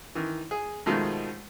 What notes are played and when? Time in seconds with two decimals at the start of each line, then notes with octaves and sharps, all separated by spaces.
0.15 D#3 E3
0.51 G#4
0.86 B2 D#3 F3 G#3 A3 D#4